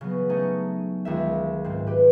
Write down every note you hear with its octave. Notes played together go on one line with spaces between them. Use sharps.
C#3 F#3 B3
A3 C#4 D#4
C#2 D#3 E5
G#2 C4
G4 B4